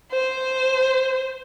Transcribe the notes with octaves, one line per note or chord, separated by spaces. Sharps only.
C5